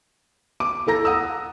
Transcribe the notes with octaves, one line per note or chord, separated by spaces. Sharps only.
D6
E4 A4 A#5 A#6
F#5 D#6 E6